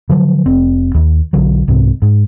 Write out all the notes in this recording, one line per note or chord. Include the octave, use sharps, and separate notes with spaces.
D3 F3 F#3
F1 C4
D#2
B1 D3 F#3
C2 G#2 C3
G#2